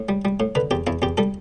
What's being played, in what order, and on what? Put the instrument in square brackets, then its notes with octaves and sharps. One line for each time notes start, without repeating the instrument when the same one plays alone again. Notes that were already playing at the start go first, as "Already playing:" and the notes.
Already playing: [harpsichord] A2
G3
G3
A2
D3 B4
E2 G4
E2 E4
E2 G4
G3 A4